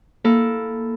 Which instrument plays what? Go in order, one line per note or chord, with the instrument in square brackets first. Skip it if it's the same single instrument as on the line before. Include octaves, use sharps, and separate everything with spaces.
[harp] A#3 E4 A4